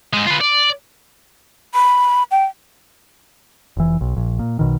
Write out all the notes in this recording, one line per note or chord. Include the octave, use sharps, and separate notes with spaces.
G#2 G#3
F4 B4
D5
B5
G5
F1 E3
B1
A#1
A#2
B1 B2 D#3